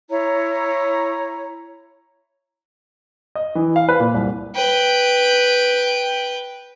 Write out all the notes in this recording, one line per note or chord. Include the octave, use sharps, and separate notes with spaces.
E4 C#5 A#5
D#5
E3
F5
B4
A#2
C2
B4 G5